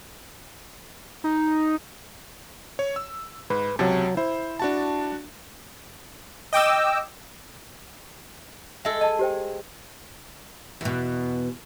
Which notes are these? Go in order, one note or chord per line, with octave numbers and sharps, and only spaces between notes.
D#4
C#5
E6
G#2 B4
C#2 C3 F#3 A5
E4 C5
D4 F#4 A5
D#5 G5 D6 E6
G#3 A4 D#5 E5 A#6
D#5 G#5 A5
G4 C5 G5
E2 B2